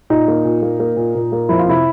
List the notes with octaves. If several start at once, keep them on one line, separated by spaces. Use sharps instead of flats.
A#2 D#4
A#3
A#2
A#3
A#3
A#2
A#2
A#3
F2 E4
F4
C3 E4